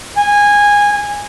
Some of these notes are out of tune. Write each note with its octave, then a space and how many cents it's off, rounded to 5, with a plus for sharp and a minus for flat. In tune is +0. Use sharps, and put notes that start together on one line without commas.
G#5 -15